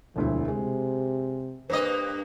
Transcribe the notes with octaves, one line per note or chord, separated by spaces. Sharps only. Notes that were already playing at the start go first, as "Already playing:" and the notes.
E1 D2 F3 E4
C3 G#3
G2 A#3 B4 C5 D#5